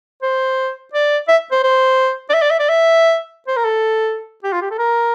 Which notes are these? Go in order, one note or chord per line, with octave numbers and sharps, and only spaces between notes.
C5
D5
E5
C5
C5
D5
E5
D5
E5
D5
E5
C5
A#4
A4
G4
F4
G4
A4
A#4